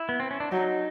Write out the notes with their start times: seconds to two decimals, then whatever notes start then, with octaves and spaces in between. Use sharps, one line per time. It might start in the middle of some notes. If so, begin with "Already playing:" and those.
Already playing: E4
0.09 B3
0.20 C4
0.31 C#4
0.40 D4
0.52 F#3 D#4